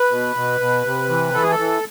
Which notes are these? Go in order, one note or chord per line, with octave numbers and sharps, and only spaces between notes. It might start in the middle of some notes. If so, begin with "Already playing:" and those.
Already playing: B4
B2
B2
B2
C3
E3
E3 A4
G#4
A4
E3